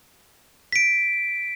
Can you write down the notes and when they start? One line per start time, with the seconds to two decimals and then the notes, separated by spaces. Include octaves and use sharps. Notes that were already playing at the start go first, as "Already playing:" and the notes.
0.72 B6 D7